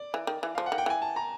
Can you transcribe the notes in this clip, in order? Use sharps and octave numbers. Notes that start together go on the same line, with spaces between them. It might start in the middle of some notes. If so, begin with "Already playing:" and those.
Already playing: D5
E3
D#3
E3
F3 F5
F#5
D#3
G5
E3 G#5
A5
A#5